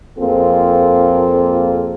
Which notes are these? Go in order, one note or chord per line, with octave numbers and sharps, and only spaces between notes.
F2 A#3 C4 F4 G#4 A4